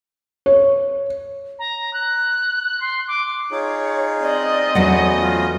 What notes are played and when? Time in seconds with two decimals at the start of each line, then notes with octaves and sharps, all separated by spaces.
0.46 C#5
1.59 A#5
1.93 F#6
2.80 C6
3.08 D6
3.51 D#4 F4 G#4 C#5
4.22 C4 D5 D#5
4.75 E2 F#3 A3 B3 C#4 F#5
5.19 F4